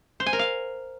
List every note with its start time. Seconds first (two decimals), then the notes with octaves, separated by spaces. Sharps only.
0.20 C5
0.26 G#5
0.33 A#4
0.39 F5